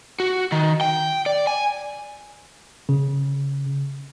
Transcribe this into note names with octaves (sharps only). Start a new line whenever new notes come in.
F#4
D#3
G5
D5
G#5
C#3